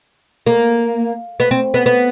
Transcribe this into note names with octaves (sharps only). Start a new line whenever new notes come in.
A#3
B3
C4
B3
B3